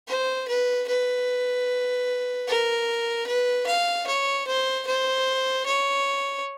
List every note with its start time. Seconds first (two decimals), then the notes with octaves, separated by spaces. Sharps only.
0.08 C5
0.48 B4
0.88 B4
2.47 A#4
3.27 B4
3.67 F5
4.07 C#5
4.47 C5
4.87 C5
5.66 C#5